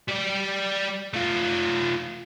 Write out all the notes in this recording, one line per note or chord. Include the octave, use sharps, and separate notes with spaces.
G3 D5
A3 F4